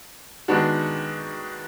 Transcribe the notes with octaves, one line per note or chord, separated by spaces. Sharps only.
D#3 G#3 B3 D4 F#4